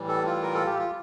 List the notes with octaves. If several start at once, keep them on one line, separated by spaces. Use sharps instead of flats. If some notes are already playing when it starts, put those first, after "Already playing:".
Already playing: A2 E3 G3
A4
F4
A#4
A4
G4
F4